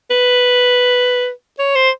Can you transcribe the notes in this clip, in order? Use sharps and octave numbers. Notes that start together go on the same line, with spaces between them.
B4
C#5
C5